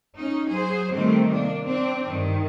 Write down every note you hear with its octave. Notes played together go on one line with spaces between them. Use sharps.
C#4 D#4
F#3 G#4 C5
C3 D#3 G3 A3 C4
A#3 D4
C4 D4
G2 D#3